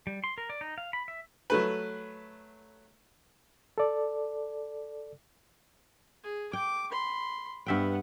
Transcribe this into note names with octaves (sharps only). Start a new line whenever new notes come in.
G3
C6
A#4
D5
D#4
F5
B5
E5
F#3 A3 B4
A4 D5
G#4
G5 D6
B5 C6
G2 B3 E5 F#5 G5